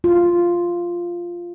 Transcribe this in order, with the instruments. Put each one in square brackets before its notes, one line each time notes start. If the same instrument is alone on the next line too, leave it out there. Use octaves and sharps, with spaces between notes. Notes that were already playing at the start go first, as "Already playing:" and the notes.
[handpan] F4